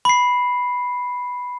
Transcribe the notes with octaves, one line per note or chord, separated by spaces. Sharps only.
B5 C7